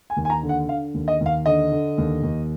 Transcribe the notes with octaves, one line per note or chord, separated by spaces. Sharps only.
G#5
D#2
G#5
A#5
D3
F#5
D3 F5
D#2
D#5
D#2
F5
D3 D#5
D3
D#2
D#2